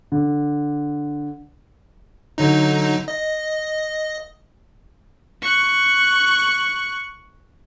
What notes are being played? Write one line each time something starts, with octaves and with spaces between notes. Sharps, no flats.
D3
D3 F#3 D#4
D#5
C#6 F#6